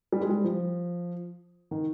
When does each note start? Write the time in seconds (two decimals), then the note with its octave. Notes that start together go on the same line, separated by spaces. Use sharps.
0.12 G3
0.21 G#3
0.30 G3
0.44 F3
1.71 D#3